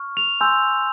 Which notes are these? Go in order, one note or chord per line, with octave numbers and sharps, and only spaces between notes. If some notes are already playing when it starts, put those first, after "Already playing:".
Already playing: C#6 F6
F7
G#5 C6 E6 G6